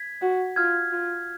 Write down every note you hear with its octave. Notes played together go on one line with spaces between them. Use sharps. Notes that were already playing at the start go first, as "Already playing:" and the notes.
Already playing: G#6 B6
F#4
F4 F6 G#6
F4